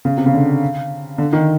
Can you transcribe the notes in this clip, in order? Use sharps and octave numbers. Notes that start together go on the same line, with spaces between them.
C#3
C3
C#3
D3
D3
D#3